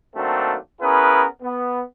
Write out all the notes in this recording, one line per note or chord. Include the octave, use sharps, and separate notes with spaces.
D#3 F#3 A3 A#3 C4 D4
B3 C#4 E4 G#4 A#4 B4
B3